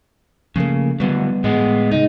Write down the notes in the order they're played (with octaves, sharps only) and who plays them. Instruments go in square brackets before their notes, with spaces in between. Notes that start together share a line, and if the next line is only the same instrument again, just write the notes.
[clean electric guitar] C#3 [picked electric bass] F3 A3 A#3
[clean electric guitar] D3 F#3 [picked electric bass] G3 B3
[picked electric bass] A2 [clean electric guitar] G#3 B3
[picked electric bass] C#3 G#3 [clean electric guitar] D#4